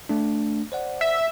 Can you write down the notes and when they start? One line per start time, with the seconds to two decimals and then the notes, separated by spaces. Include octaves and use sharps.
0.09 A3 D4
0.72 C5 D5 F#5
1.01 E5